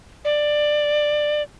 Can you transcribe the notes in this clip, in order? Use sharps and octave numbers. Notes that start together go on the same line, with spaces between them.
D5